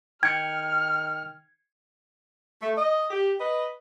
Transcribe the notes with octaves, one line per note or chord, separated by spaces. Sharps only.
D#3 G5 F6 G#6 C#7
A3
D#5
G4
B4 D#5